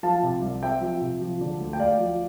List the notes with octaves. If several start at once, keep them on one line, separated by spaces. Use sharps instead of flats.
F3 F5 A5
C3
C2
C4 E5 G5
F3
C3
F3
D3
D2
G5
D2 D5 F5
F3